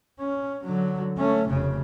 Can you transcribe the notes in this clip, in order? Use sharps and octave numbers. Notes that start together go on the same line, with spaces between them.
C#4
D3 F#3
A3 C#4
F1 C#3